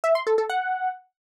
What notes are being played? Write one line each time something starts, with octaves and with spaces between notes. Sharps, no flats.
E5
C6
A4
A4
F#5